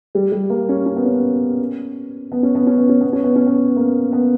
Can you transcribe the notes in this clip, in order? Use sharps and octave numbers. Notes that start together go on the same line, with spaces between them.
G3
G3
A#3
C#4
C#4
B3
C#4
B3
C#4
B3
C#4
B3
C#4
B3
C#4
B3
C#4
B3
A#3
B3